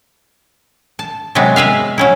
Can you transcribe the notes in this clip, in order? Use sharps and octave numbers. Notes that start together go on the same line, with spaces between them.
A5
C3 F#3 G#3 B3
G#3 B4 E5 F5
F#3 C#4 E4